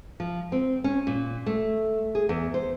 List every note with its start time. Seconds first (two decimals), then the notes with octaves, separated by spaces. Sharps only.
0.20 F3
0.52 C4
0.84 C#4
1.07 A#2
1.46 A3
2.15 G#4
2.29 E2
2.54 C5